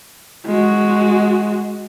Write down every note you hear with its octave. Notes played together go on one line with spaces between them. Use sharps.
G#3 F#4